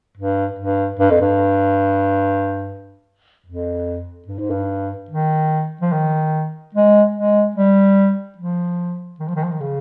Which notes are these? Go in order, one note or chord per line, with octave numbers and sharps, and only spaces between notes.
G2
G2
G2
F2
G2
F2
G2
G#2
G2
D#3
F3
D#3
G#3
G#3
G3
F3
D#3
F3
D#3
F3
D#3
C#3